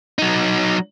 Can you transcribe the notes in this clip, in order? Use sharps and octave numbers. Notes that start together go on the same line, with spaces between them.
F#3 D#4